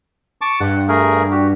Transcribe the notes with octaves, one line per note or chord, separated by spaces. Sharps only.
A5 C#6 D6
G2 F#5
A3 G#4 A#4
F#4 G4